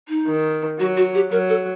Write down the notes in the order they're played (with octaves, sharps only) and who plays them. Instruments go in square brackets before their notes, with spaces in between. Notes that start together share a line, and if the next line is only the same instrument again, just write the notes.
[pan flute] D#4
[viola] D#3
[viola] F#3 [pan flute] F#4
[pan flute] F#4
G4
[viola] F#3 [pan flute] A#4
[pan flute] A4